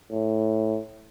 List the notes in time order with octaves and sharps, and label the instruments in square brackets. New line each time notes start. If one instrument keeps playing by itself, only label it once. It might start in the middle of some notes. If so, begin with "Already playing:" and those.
[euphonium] A2